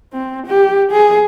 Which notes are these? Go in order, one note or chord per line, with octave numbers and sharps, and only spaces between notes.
C4
G4
G#4